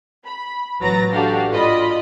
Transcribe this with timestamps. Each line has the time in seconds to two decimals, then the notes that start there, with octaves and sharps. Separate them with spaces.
0.25 B5
0.80 A1 F#3 B4 A#5 A6 A#6
1.11 D4 F#4 G4 A4 F5
1.50 G#2 F4 D5 D#5 B5